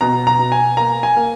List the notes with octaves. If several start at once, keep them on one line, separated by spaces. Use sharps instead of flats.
B2 A#5
A#5
B2
G#5
A#3 A#5
G#5
A#3